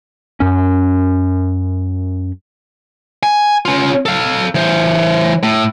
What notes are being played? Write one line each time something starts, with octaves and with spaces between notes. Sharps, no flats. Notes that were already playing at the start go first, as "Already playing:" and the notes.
F#2 C#4
G#5
C#4 F4
A4 F5
E3 C5
A2